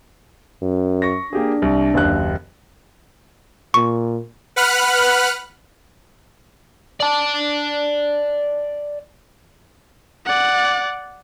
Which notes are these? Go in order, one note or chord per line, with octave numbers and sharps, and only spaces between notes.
F#2
C#6 A#6
A#3 D4 G4 G#4
C2
F#1 D#2 F#6
A#2 C#6
B4 F#5 B5 F6 F#6
D5 A5
D5 F#5